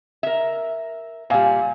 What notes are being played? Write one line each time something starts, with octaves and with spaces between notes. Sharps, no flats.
A#4 E5
A#2 G3 F5 G#5